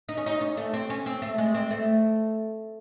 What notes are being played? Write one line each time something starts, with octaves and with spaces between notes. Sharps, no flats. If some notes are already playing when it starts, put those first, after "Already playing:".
D#4
C#4
D#4
C#4
A3
C4
C#4
C4
A3
G#3
C4
A3